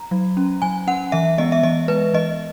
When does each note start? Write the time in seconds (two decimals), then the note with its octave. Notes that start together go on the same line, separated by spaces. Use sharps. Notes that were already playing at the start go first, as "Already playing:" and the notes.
Already playing: A#5
0.11 F#3
0.37 C#4
0.62 F#3 G#5
0.87 C#4 F#5
1.12 E3 E5
1.38 G#3 B3 D#5
1.52 E5
1.63 E3 D#5
1.88 G#3 B3 B4
2.14 E3 D#5